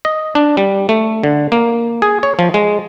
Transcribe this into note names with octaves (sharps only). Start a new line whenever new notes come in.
D#5
D4
G3
A3
D3
A#3
G#4
C#5
F3
G#3